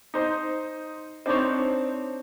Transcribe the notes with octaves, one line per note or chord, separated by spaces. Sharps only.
D#4 C5 D#5
C4 D4 D#4 C5 C#5